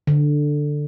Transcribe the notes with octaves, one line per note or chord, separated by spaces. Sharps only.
D3